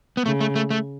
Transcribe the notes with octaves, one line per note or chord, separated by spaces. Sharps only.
B3
C#3 A3
A3
A3
A3